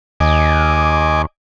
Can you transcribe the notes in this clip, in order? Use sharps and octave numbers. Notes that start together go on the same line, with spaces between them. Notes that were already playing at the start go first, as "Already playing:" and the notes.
D#2 D#5 G#5 D6